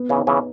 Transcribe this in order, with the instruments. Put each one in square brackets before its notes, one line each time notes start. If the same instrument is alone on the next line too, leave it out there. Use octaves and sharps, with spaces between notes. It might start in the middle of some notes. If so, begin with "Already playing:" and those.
Already playing: [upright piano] B3
[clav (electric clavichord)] C#3 E3
[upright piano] D#4
[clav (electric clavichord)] C#3 E3